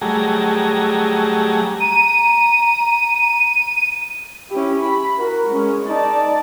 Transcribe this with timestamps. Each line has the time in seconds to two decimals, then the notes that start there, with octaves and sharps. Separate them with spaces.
0.01 F#3 G3 A3 G#4 A#5
1.80 A#5 D#7
4.51 C#4 E4 G4
4.84 B5
5.19 F#4 A#4
5.51 G#3 C#4
5.89 D#4 D5 A5